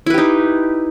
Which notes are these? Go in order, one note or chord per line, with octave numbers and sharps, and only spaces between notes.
D#4 E4 G4 B4